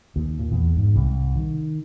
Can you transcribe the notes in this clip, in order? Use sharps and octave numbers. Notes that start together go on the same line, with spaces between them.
D#2
A#2
E2
G#2
C2
D#3